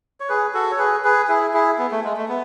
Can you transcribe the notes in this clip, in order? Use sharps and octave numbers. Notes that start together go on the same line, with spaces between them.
C#5
G#4 B4
F#4 A4
C#5
G#4 B4
G#4 B4
E4 G#4
E4 G#4
B3
A3
G#3
A3
B3